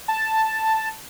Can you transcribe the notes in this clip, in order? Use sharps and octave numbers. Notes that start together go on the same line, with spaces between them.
A5